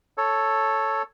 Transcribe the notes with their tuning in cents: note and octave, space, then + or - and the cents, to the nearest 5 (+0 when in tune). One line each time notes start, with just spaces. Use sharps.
A4 +0 C#5 +0